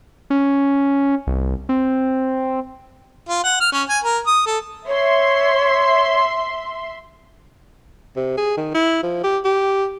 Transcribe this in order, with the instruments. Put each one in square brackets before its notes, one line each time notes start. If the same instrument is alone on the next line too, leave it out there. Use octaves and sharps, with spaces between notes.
[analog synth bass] C#4
C2
C4
[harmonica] F4
F#5
F6
C#4
G#5
A#4
D#6
A4
[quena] C#5 [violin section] E5 C6
[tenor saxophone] C3
G#4
D#3
E4
F3
G4
G4